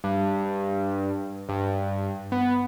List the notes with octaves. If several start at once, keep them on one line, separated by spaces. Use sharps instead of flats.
G2
G2
B3